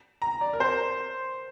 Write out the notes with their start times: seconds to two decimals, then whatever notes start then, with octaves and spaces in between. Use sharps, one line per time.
0.22 A#5
0.41 D5
0.53 A#4
0.60 C5